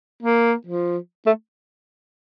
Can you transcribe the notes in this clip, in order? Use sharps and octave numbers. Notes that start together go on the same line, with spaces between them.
A#3
F3
A3